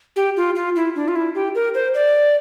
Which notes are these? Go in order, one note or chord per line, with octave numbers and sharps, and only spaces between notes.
G4
F4
F4
E4
D4
F4
E4
G4
A#4
C5
D5